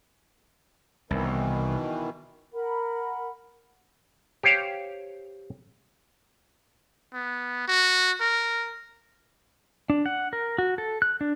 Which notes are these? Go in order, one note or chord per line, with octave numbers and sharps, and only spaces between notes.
C2 B2 D#3 E3
A#4 F#5 B5
G4 C5 C#5 F5
B3
F#4
A#4
D4
F#5
A#4
F#4
A4
F#6
D4